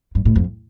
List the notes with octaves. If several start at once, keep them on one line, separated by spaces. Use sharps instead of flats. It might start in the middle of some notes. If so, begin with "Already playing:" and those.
G2
A2
F2